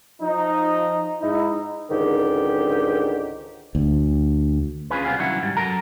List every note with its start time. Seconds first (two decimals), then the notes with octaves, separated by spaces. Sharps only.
0.21 F3 D#4
1.20 G#2 D#4 E4
1.90 C#2 G#2 D3 D#3 G4
3.75 D2
4.90 C#4 F4 G#4 B4
5.05 C2 G3 B3 C4 F#4 F5
5.19 C2 D#3 F#3 C#4 E4 F#5
5.43 G#2 G3
5.56 F#2 F#3 A4 A#4 A#5